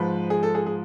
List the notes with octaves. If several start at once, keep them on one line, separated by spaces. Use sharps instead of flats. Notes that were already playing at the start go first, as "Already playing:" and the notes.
Already playing: G#2 F3 B4
G#4
A4
G#4
G#4